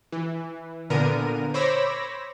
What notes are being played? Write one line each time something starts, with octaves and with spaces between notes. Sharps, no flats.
E3
A#2 D3 B3 A#4 D#7
C5 C#5 B5 D6 E6 A#6